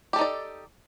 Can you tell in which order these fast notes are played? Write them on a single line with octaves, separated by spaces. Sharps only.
G4 A4 D#4 D5